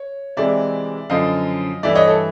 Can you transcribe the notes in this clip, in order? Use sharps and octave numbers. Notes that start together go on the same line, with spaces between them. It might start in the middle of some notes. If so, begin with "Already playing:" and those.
Already playing: C#5
C3 E3 G#3 C4 D5 E5
F#2 D3 F3 D#5 F5
G2 E3 A3 D5 E5
C#5 D#5
A4